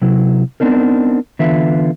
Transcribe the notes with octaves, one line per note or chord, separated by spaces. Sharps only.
C3 F#3 E4
B3 C4 D4 D#4 A#4
D3 E3 B3 F4 E5